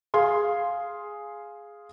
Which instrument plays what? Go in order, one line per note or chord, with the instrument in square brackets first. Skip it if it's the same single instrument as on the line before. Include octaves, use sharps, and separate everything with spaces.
[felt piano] G#4 F5 C6